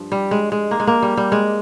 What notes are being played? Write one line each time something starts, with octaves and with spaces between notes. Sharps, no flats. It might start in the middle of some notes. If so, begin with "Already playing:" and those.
Already playing: G2 F3
G3
G#3
G#3
A#3
G#3
A#3
G3
G3
G#3